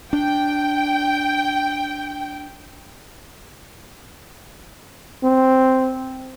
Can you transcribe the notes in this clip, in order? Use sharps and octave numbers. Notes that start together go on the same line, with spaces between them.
D4 G5
C4